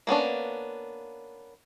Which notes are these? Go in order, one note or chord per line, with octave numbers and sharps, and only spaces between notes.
A#3 B3 C#4 D4